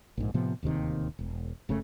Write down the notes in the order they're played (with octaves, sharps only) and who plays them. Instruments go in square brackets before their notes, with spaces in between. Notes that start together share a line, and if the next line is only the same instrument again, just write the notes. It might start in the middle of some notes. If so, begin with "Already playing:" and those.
[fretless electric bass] A#1 G#2
A2 C3 F3 B3
D1 D#2 C3 D#3
E1
F#1 C#3 A3